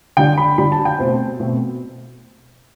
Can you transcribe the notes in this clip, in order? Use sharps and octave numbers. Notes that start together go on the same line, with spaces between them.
D3 G3 D4 G5
B5
D3 G3 D4 B5
A5
G5
B2 A3 C4 C5
B2 A3 C4